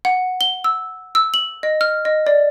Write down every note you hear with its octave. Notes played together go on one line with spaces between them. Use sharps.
F#5
G7
E6
E6
F#7
D#5
F6
D#5
D5